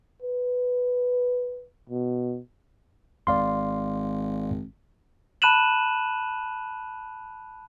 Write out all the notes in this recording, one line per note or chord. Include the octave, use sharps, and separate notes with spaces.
B4
B2
G#1 D5 F5 C6
A5 B5 F#6 D#7 E7 F#7